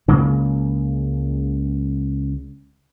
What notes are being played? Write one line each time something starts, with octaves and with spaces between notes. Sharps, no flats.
C#2 C#3 G#3 A#3